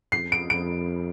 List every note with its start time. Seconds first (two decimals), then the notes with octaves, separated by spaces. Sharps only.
0.12 F2 C7
0.32 D7
0.50 F2 D7